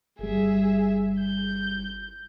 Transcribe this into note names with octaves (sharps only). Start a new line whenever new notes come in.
G1 G3 G#4 E5
G6